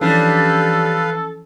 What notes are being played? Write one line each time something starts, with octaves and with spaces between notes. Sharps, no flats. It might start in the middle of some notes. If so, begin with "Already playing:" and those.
E3 F3 G3 C#4 D4 A4 B4 F5